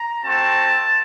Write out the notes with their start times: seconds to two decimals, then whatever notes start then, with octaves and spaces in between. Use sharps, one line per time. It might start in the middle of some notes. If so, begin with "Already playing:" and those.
Already playing: A#5
0.23 A3 C4 F#4 A5